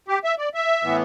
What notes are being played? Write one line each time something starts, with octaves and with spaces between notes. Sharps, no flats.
G4
E5
D5
E5
A2 E3 B3